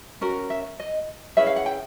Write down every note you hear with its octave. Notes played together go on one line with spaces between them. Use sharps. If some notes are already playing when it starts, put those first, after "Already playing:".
C#4 F#4 A#4
E5
D#5
C#4 E4 G#4 B4 E5
F5
F#5
G5